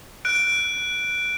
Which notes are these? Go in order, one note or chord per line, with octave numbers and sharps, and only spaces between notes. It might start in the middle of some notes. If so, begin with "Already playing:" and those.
F#6 D7